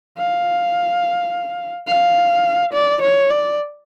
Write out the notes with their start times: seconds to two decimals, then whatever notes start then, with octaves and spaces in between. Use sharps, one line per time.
0.18 F5
1.88 F5
2.73 D5
3.02 C#5
3.30 D5